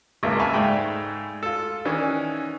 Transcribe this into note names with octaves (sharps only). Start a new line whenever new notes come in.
G#1 C#2 G#3 A#3 E5
E5 F5 G#5 A5 B5 C#6
G#2 G#3 A3 D5 G5 B5
F4 A4
D#3 E3 C#4 D4